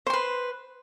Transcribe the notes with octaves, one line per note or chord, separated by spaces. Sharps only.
B4 C5 C6